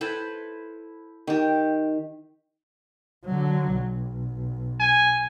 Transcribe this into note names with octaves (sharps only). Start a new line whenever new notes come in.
E4 A4 B4 C5
D#3 G4
D3 F#3
B1
G#5